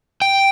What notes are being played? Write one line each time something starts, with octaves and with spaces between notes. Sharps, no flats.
G5